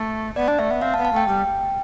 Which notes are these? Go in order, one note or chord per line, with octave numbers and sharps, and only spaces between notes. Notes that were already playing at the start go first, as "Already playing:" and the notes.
Already playing: A3
B3 D5
D4
A3 E5
B3
C4 F5
A5
B3
A5
A3 G5
G3